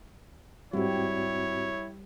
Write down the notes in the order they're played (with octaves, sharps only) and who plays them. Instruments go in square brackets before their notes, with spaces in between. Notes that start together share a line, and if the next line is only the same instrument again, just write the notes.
[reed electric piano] G#2 C4 F#4 [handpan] G3 G4 [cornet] E4 [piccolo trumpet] C#5